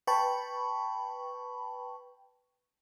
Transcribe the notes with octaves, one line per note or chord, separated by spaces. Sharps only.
B4 G5 A5 B5 C#6